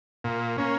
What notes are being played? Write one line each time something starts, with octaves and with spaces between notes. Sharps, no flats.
A#2
A#3 C#4